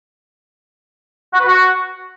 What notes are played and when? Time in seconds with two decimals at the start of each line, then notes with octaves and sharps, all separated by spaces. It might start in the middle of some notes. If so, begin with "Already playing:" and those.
1.33 F#4
1.40 B4
1.46 F#4